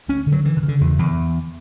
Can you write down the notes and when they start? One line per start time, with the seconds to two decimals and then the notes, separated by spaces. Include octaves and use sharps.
0.08 D2 C#4
0.26 D3
0.32 F#3
0.45 C#3 E3
0.57 D3
0.63 C#3
0.68 D3
0.81 E2
0.99 E2